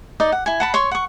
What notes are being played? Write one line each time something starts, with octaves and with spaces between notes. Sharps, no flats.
D#4 D5 D#5
F#5
E4 G#5
F#5 A5 B5
C#5 C6 C#6
F#5 C#6